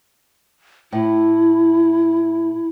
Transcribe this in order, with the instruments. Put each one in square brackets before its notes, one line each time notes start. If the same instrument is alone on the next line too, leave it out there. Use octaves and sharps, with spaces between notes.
[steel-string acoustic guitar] A2 [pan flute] E4